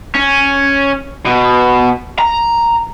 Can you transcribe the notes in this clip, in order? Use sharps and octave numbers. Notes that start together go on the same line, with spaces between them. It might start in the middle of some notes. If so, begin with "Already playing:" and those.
C#4
B2
A#5